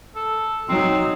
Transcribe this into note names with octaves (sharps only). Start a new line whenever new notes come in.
A4
F#3 C4 D#4